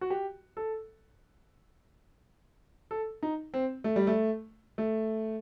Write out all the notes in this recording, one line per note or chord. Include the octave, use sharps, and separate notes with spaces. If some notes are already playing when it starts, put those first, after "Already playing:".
F#4
G4
A4
A4
D#4
C4
A3
G3
A3
A3